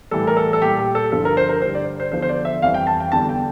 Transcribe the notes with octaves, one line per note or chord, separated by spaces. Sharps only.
A2 E3 G3 A4
A#4
A4
A4
A#2 G3 G4
G4
A4
G2 D3 F3 A4
A#4
C5
A#4
G2 D3 G3 C5
D5
C5
E2 D3 F3 C5
C5
D5
E5
F2 E3 G3 F5
G5
A5
G5
E2 D3 G3 A5
G5